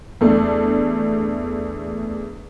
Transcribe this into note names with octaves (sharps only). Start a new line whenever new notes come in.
E2 A3 D4